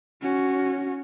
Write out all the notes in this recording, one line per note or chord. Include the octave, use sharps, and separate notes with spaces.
C#4 F#4